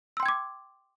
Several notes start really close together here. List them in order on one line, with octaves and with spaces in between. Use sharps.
E6 C6 G5 G#6 D6